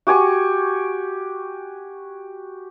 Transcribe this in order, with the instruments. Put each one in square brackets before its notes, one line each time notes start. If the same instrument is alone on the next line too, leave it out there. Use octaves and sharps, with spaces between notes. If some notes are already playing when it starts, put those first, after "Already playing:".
[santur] F#4 G4 G#5 C#6